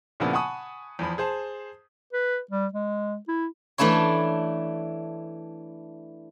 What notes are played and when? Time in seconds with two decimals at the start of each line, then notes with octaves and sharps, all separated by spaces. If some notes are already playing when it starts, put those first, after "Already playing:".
0.20 A#2 C#3 F3 A#3 B3 E4
0.33 F#5 G#5 A5 B5 C#6 D#6
0.99 E2 F3 B5
1.18 G#4 C5 A5
2.13 B4
2.51 G3
2.73 G#3
3.28 E4
3.78 E3 A3 D4 E4 C#5